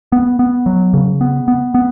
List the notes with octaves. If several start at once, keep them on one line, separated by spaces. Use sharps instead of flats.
B3
B3
F#3
C#3
B3
B3
B3